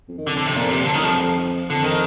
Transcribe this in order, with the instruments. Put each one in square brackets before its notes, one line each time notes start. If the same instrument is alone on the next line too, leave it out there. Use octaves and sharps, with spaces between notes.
[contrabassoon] F2
D#3
[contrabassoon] F2 [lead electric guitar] D3
[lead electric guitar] D3
C3
A#2
C3
[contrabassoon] G2 [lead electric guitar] D3
[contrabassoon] A2 [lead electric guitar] D#3
[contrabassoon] F2 [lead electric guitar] F3
[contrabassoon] F2 [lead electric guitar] D3
[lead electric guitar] D#3